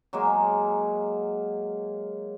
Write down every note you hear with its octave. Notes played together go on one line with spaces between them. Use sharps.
F#3 G#3 A#3